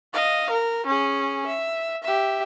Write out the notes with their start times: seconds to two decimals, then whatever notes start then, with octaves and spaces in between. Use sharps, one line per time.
0.13 D#5 F5
0.50 A#4
0.86 C#4 G#4
1.47 E5
2.03 G4 E5